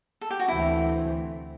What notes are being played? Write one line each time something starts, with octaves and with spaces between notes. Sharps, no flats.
A4
G4
F#4
D2 C3 E3 A3 C4 E4